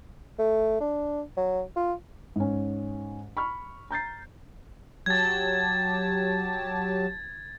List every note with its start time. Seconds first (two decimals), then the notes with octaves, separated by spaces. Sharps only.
0.39 A3
0.80 D4
1.37 F#3
1.76 F4
2.36 G#2 C#4
3.37 B5 C#6 F6
3.91 A#5 G6 A6 C7
5.06 F#3 G4 A5 G#6 A6